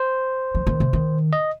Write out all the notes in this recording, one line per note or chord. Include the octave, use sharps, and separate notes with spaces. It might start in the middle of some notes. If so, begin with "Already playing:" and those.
Already playing: C5
F3
D#3
C3
D#3
D#5